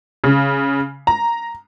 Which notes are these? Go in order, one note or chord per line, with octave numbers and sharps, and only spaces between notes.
C#3
A#5